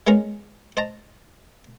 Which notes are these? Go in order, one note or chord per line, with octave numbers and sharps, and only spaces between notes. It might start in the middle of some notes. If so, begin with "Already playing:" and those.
G#3 B3 C#4 D#4 G#4 A#4
C5 D#5 A5 A#5